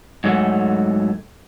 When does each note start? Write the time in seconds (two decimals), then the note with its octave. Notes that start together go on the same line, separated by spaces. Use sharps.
0.24 G#2 F#3 A3